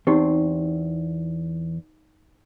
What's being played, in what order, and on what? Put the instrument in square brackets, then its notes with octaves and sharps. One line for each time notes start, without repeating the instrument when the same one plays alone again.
[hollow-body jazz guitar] E2 C4 [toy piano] D#4 F#4 G4